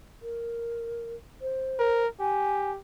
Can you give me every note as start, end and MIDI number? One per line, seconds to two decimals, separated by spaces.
0.22 1.15 70
1.41 2.03 72
1.79 2.07 70
2.20 2.78 67
2.20 2.71 80